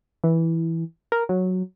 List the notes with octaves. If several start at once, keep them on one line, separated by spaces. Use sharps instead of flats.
E3
A#4
F#3